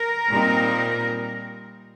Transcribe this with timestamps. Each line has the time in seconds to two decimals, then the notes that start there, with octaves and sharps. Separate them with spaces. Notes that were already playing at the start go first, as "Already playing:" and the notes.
Already playing: A#4
0.28 A#2 G3 C4 D#4